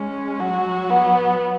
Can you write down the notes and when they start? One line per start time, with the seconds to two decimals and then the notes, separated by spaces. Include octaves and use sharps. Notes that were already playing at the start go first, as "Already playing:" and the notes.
Already playing: G#3 C#4
0.40 F#3 F#4
0.90 B3